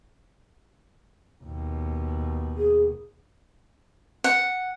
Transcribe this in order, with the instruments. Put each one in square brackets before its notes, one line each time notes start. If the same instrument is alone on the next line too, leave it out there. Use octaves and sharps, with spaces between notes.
[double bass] D#2 B2
[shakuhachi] G#4
[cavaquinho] F#5